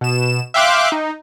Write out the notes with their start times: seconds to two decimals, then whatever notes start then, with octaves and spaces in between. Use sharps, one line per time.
0.01 B2 E7
0.54 E5 F5 G5 C6 D6 F#6
0.92 D#4